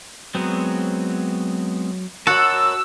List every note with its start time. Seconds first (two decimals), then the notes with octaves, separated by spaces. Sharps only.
0.35 F#3 G#3 B3 C4
2.27 F#4 A#4 C#5 F#5 A5 E6